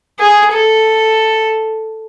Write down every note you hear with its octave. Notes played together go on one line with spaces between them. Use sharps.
G#4
A4